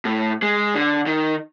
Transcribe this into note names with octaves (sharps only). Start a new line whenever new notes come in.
A2
G#3
D3
D#3